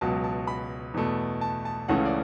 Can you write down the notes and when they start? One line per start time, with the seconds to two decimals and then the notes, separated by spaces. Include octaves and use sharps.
0.01 C#2 B2 F#3 A5
0.24 A5
0.47 B5
0.94 E2 B2 A3
1.41 A5
1.65 A5
1.88 C#2 C#3 E3 A3 C#4 F#5
2.05 D5